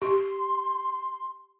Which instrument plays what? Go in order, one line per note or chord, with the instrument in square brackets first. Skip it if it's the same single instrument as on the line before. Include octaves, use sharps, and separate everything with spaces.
[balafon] G4 [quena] C6